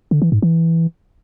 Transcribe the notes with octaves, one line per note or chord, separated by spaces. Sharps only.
D3
E3
G#2
E3